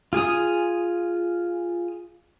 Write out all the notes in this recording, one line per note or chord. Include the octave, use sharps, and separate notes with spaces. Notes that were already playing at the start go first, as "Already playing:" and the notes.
F4 G#4 G#5 D#6